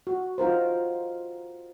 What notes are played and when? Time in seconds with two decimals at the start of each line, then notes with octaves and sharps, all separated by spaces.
0.07 F#4
0.38 D#4 F4 A#4 C5